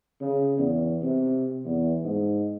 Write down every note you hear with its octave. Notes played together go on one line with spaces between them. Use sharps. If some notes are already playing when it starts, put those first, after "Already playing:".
C#3
E2
C3
E2
G#2